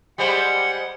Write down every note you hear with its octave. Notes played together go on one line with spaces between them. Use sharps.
G3 G#3 C5 F#5